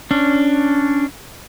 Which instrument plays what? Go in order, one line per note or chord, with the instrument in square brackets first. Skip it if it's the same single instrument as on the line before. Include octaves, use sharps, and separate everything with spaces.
[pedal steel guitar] C#4 D4